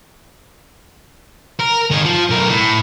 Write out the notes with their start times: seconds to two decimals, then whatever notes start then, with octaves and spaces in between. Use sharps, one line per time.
1.60 A#4
1.91 D#3 G#4
2.05 F3
2.30 B1 A#4
2.49 A2